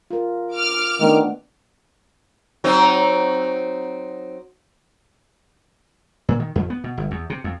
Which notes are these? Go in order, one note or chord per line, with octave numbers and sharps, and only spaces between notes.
F4 A#4
D6 F6
D#3 A3 B3 D4
F#3 C4 D#4
A#2
D#3
F2
B3
B2
G1
E2
C3
F2